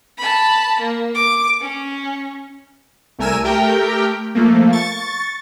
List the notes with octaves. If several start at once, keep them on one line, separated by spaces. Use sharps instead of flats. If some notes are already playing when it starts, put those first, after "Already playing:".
A5 B5
A#3
D6
C#4
C2 A3 A#4 G#5 E6 D#7
A3 G4 A#4 G5
F3 A3 A#3
C#6 A6